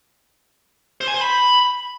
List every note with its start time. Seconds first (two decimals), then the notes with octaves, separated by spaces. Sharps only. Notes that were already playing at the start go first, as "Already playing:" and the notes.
1.01 C5
1.08 G#5
1.14 C5
1.21 B5